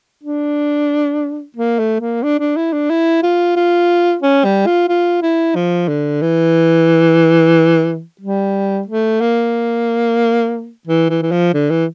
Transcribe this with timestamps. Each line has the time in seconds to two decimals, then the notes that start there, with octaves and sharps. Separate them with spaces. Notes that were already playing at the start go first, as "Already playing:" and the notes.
0.23 D4
1.57 A#3
1.79 A3
2.01 A#3
2.23 D4
2.39 D4
2.56 E4
2.73 D4
2.90 E4
3.23 F4
3.56 F4
4.22 C#4
4.44 G3
4.66 F4
4.88 F4
5.22 E4
5.55 F3
5.88 D3
6.22 E3
8.21 G3
8.87 A3
9.21 A#3
10.87 E3
11.10 E3
11.22 E3
11.31 F3
11.54 D3
11.70 E3